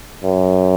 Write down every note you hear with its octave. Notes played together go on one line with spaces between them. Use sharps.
F#2